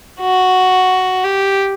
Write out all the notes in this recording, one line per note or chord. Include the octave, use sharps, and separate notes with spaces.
F#4
G4